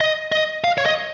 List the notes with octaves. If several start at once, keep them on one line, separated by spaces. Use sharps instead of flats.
D#5
D#5
F5
C#5
D#5